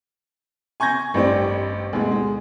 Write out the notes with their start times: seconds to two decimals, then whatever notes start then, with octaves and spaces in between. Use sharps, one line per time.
0.80 G#5 C#6 G6 G#6 A#6
1.14 A1 G2 C4 D5
1.93 D2 B2 G#3
2.11 G#3